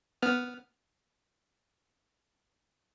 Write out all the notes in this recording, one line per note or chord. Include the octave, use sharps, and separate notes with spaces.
B3 F6